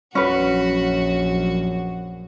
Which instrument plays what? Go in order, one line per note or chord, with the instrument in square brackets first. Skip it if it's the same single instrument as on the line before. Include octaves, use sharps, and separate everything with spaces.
[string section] A#1 F#2 [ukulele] C#4 B4 [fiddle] F#4